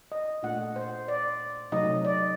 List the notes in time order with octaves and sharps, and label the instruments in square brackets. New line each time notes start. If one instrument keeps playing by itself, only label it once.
[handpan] D#5
A#2 A3 D4 F#5
C5
D5
C3 F#3 A3 D#4 D#5
D5